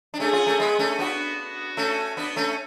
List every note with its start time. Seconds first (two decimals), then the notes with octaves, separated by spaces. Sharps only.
0.14 D4
0.20 A3 C#4 G#4
0.33 C#4 F4
0.46 A3 C#4
0.60 G#3 B3
0.79 A3 C#4
0.99 B3 D4 F#4
1.38 F#4
1.77 A3 C#4
2.17 B3 D4
2.36 A3 C#4